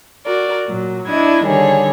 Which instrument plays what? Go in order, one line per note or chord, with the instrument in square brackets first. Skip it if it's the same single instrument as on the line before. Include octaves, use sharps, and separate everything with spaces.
[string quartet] F#4 A#4 D5
A#2 F#3
D4 E4 D#5 G#6
D3 D#3 G3 G#4 C#5